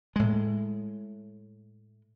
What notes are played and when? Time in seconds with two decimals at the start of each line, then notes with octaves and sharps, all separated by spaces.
0.16 A2 G#3